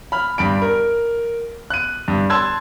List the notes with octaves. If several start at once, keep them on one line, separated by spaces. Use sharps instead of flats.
B5 F6
G2 B5 D7
A#4
F#6 D#7
G2
A5 C6 E6 F#6 G#6